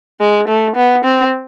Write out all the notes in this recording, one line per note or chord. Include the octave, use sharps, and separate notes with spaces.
G#3
A3
B3
C4